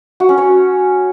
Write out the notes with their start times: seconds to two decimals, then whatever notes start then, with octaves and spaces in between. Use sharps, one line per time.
0.20 F#4
0.29 C#4
0.38 C#5